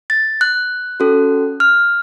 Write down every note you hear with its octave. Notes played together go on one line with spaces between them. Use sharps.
A6
F#6
C#4 F#4 A4
F6